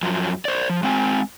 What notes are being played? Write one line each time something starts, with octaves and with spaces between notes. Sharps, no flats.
F#2 F3 F#3
C5 D5
F3
G#3 C4 F#5 G#5